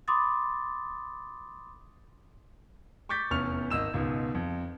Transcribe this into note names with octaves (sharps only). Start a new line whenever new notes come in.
B5 C6 D6 D#6 A6
C#6 D6 G6 A6 B6
F1 E2 C#4 C#6 F6 F7
G#1 D#5 E6 E7
C#2 G#2 B2
F2